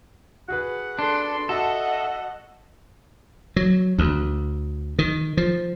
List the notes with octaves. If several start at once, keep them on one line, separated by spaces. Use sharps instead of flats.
F#4 G#4 B4 F#5
D4 A4 C6
F#4 A4 D#5 E5 F#5 A5 E6
F#3
D2
D#3
F3